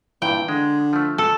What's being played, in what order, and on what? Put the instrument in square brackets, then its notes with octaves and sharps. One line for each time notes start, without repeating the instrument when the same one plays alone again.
[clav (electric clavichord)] G2 A#2 [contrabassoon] E3 [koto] G5
[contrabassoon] D3 [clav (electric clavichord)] G#3
[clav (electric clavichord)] F3 A3
[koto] A4